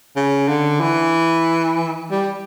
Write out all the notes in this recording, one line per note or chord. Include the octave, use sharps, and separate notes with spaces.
C#3
D3
E3
G3